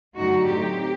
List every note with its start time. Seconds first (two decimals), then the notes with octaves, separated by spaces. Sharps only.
0.17 F#2 D3 F#3 A3 D#4 F#4
0.47 A2 F#3 C4 D#4 G4